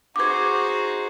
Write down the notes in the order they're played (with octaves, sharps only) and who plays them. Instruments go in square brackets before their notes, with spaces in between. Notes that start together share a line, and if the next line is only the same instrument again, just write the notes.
[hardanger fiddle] D#4 F#4 [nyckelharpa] G#4 C5 [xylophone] D6 G#6